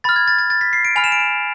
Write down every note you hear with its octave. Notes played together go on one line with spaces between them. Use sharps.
B5 F6 A6
G#6
A6
A6
A6
B6
C7
D7
G#5 B5 F6 F7
E7
D7
E7